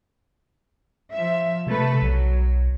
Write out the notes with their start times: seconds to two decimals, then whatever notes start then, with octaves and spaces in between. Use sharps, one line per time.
1.12 F3 E5
1.67 C3 A3 A4 B4
2.02 B1 F#3